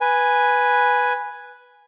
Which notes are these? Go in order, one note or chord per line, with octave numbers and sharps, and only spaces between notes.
B4 G#5